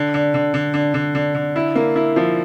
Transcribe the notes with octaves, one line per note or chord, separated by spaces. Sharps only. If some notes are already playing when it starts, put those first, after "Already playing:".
Already playing: D3
D3
D3
D3
D3
D3
D3
D3
E4
A#3
E4
F3